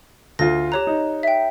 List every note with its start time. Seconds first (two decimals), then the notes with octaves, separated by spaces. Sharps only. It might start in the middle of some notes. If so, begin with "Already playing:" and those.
0.39 D2 F4 A#6
0.72 G4 C#5 A#5 F#6
0.87 D#4
1.23 E5 G5